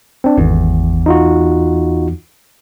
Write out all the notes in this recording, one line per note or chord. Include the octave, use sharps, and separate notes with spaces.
C4 D4
G#1 E2
D#4 F4 F#4